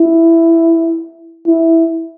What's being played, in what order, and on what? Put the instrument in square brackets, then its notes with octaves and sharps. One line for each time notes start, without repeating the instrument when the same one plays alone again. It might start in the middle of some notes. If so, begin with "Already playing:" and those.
Already playing: [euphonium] E4
E4